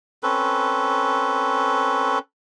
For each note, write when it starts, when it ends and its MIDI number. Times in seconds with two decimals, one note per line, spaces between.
0.23 2.19 60
0.23 2.19 61
0.23 2.19 69
0.23 2.19 71